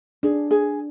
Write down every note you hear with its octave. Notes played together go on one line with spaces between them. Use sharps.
D4 G#4
G#4